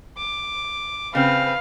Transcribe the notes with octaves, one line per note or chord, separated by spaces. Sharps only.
D6
C#3 C4 B4 F5